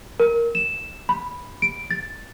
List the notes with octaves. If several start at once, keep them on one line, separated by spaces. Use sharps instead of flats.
A#4
E7
B5
D7
A6